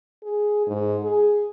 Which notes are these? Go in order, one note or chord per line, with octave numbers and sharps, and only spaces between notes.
G#4
G#2
G#4